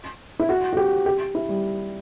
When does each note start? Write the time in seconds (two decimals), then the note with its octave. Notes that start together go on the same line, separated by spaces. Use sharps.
0.39 E4
0.49 F#4
0.73 F#4
0.77 G4
1.06 G4
1.35 E4
1.49 G3